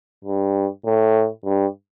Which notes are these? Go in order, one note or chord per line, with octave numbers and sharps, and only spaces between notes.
G2
A2
G2